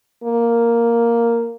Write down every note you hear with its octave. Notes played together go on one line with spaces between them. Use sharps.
A#3